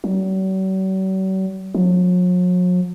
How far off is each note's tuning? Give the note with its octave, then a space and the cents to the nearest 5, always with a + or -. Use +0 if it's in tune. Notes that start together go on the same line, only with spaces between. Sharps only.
F#3 +45
F#3 -45